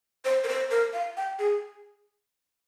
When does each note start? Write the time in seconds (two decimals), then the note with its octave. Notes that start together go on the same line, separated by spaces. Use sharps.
0.25 C5
0.44 A#4
0.49 C5
0.71 A#4
0.93 F5
1.17 G5
1.39 G#4